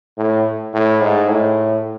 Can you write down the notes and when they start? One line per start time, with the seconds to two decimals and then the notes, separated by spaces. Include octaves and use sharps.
0.17 A2
0.74 A2
1.01 G#2
1.30 A2